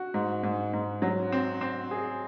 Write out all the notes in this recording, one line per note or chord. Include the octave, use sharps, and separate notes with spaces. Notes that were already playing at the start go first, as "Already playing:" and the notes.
Already playing: F#4
G#2
G#2
G#2
F#3
C4
C4
G#4